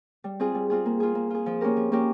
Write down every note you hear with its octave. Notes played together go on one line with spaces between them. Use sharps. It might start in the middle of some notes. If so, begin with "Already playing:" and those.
G3
C4 F4 G#4
G3
C4 F4 G#4
A#3
F4 G#4
A#3
F4 G#4
F3
A#3 C#4 G4 A#4
F3
A#3 C#4 G4 A#4